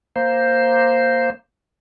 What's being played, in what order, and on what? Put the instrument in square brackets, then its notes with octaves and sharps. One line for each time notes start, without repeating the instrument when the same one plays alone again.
[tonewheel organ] A#3 C5